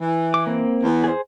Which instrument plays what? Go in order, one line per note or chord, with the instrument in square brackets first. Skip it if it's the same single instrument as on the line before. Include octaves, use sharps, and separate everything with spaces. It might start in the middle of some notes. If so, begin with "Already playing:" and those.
[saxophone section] E3
[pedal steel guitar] D6
A#3 C4
[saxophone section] E2
[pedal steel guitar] G#4 C5